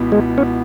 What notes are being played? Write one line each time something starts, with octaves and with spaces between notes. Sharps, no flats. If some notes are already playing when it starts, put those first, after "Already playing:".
Already playing: C#2 B2 B3 E4
G#3
C#4